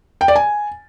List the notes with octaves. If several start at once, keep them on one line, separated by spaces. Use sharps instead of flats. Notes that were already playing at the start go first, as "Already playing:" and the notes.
G5
D5
G#5